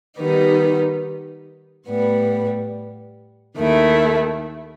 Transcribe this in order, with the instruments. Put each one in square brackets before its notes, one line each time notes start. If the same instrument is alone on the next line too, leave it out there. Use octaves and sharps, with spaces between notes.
[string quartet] D#3 G3 B3 D#4
A2 G3 B3
D#2 D#3 A3 E4